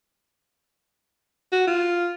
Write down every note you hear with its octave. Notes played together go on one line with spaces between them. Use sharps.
F#4
F4